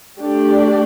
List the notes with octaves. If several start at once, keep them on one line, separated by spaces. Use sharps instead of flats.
A3 D4 G4 D5